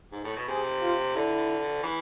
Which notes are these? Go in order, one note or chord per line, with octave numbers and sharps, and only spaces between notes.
G#2
A2
B2
C3 G#4
F4
D3 E4
E3